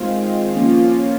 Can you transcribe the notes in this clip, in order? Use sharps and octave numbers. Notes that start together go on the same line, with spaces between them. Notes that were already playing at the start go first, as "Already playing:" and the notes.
Already playing: D#3 G#3 C4 F4
F3 A#3 C#4